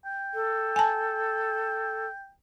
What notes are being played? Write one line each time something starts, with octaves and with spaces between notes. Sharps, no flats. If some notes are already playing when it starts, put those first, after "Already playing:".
G5
A4
G#5 A5